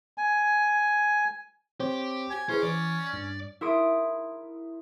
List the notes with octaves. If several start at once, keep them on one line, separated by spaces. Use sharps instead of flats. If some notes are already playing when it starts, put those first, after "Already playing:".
G#5
C4 G4 C5 C#5
G#5
C#4 E4 G#4 B4 C5
E3 D5
G2
E4 A#4 C6 D#6 D7